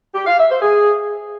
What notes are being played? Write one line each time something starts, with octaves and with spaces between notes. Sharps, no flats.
G4
F5
E5
C5
G#4